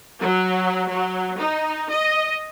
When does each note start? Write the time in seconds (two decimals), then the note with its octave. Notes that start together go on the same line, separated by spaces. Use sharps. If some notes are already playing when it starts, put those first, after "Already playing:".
0.20 F#3
0.88 F#3
1.38 D#4
1.89 D#5